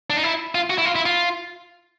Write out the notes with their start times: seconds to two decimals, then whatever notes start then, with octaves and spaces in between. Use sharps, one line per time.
0.10 D4
0.17 D#4
0.23 E4
0.55 F4
0.70 F#4
0.78 E4
0.85 F4
0.96 E4
1.06 F4